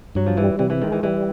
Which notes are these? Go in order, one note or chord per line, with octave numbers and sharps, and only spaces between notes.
G2 F#3
F3
E3 G3
C3 E3
E3
D#3 G#3
E3
E3 G3